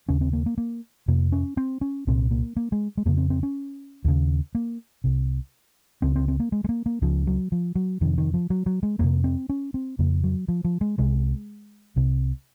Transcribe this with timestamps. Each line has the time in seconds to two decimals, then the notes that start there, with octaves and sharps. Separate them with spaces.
0.09 D#2 C#3 C#4
0.21 C4
0.33 A#3
0.46 A#3
0.58 A#3
1.08 F2 C3 A#3
1.32 C#4
1.57 C4
1.81 C#4
2.07 C2 A#2 C4
2.31 A#3
2.56 A#3
2.72 G#3
2.97 G#3
3.06 F2 C#3 A#3
3.18 C4
3.30 C4
3.43 C#4
4.04 D#2 C#3
4.55 A#3
5.04 C2 C3
6.02 C#2 C#3 C4
6.15 C4
6.28 C4
6.40 A#3
6.52 G#3
6.64 G#3
6.69 A#3
6.86 A#3
7.02 C#2 C#3 F3
7.27 F#3
7.52 F3
7.75 F#3
8.01 F2 C3 D#3
8.18 D#3
8.34 F3
8.50 F#3
8.66 F#3
8.83 G#3
8.99 F2 C3 A#3
9.24 C4
9.49 C#4
9.74 C4
9.99 F2 C#3 A#3
10.24 F#3
10.48 F3
10.64 F3
10.81 G#3
10.98 C2 C3 G#3
11.96 C2 C3